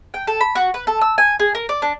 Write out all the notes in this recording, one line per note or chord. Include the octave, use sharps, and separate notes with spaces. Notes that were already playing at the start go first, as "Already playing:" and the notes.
G5
A4
B5
F#4
B4
A4
E6
G#5
G#4
A#4
D5
D4